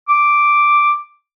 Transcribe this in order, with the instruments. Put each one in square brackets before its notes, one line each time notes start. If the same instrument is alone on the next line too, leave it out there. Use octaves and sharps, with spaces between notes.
[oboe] D6